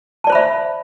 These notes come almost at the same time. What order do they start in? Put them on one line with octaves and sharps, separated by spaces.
A5 D5 C5 B5 E5